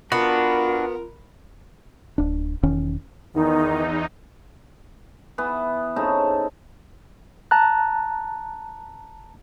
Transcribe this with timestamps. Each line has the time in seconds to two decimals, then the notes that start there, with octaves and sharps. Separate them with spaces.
0.12 B3 D4 F4 F#4 A#4
2.18 D1 D4
2.63 E1 D#3 C#4
3.34 E2 D#3 D#4
5.38 E3 B3
5.96 C#3 C4 D#4 A4
7.51 A5 A#5 F#6